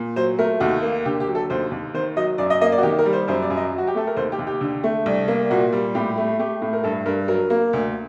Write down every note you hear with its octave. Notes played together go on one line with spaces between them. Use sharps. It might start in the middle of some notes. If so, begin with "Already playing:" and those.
Already playing: A#2
F#3 C5
A3 A#4
D#2 F#4
A#3
D3 G4
G4
F#3
A4
D#2 C5
D#2
D#3 C5
F#3 D#5
F#2 D5
D#5
A#3 D#5
D5
F#4
D#3 G4
A#4
G3
C5
F#2 C5
D5
F#2
D#5
F#3
F#4
G4
A3 A4
A#4
D#2 C5
G4
D#2
G4
D3
A3
C2
A#3
A#2 F#4
G3
A2 G4
A3
A3 G4
A2
A#4
G2 A4
G2 A#4
F#3 A#4
A#3
D2